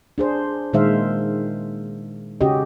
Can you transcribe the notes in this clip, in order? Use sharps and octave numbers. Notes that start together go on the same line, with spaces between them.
D4 G#4 C5
A#2 D#3 G#3 C5 E5 F5
C#3 C#4 F#4 G4 D#5